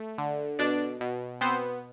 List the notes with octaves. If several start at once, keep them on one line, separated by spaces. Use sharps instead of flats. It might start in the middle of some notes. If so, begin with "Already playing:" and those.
Already playing: A3
D3
B2 D4 D5
B2
B3 C4 C5